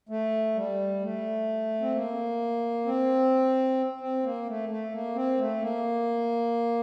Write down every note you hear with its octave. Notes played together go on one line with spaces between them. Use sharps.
A3
G3
A3
C4
A#3
C4
C4
A#3
A3
A3
A#3
C4
A3
A#3